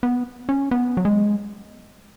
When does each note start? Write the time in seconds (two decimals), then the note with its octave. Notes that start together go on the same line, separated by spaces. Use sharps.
0.03 B3
0.49 C#4
0.71 B3
0.97 F#3
1.05 G#3